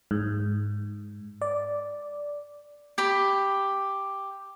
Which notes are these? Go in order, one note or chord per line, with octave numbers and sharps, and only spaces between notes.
G#2
D5
G4 B5